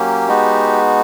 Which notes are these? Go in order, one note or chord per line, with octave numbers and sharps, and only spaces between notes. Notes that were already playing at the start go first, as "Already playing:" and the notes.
Already playing: F#3 A#3 C#4 G4
G#3 B3 D#4 F#4